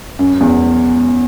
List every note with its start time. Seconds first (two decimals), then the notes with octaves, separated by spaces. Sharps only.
0.19 F#2
0.41 E2